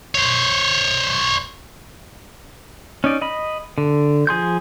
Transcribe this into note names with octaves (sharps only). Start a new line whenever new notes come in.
C5 C#5
C#4 D#4 D5
D#5 B5
D3
F3 G#4 C6 G6